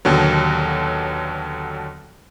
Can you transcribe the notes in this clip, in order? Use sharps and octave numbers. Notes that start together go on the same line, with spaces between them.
D#2 B2 D3 F#3